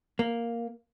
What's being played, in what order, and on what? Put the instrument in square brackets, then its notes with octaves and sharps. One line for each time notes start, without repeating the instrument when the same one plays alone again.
[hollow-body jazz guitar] A#3